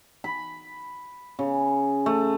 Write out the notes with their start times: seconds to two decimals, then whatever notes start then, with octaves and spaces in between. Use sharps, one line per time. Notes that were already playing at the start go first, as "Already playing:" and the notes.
0.24 B5
1.39 C#3
2.06 A3